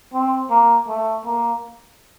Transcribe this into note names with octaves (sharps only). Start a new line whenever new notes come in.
C4
A#3
A3
A#3